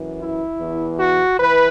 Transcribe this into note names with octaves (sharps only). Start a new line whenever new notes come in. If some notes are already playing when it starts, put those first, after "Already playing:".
Already playing: F#2 E3
E4
E2 E3
F#4
E3 B4